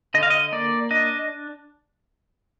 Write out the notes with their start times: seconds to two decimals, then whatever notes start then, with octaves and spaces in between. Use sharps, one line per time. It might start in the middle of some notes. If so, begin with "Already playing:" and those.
0.14 D3 D#5
0.23 F5
0.30 D#5
0.52 A#3 D5
0.91 D4 D#5